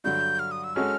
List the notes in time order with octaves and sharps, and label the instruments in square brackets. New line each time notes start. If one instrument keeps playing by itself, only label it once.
[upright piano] G2 D3 F#3 [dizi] G6
[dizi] F6
D#6
E6
[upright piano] G#3 C#4 F#4 A4 [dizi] F6